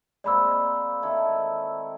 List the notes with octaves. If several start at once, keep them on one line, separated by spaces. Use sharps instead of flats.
G#3 A#3 C4 D5 B5 E6
D#3 E4 A4